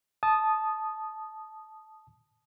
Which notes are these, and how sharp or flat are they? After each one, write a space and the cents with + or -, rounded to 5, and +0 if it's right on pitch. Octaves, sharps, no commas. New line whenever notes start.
A5 -15 D#6 -5